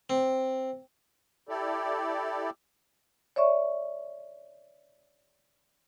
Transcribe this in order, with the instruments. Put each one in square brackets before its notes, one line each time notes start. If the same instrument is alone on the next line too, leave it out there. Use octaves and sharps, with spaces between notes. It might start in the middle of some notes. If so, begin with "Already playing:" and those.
[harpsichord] C4
[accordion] E4 G4 A4 D5
[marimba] C#5 D5 E5 C#6